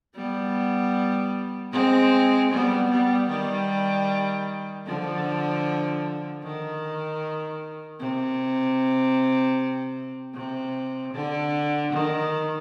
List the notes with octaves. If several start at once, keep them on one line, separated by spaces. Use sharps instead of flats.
G3 B3
G#3 C4
G3 B3
G3 B3
D#3 G3
D3 F3
D#3
C3
C3
D3
D#3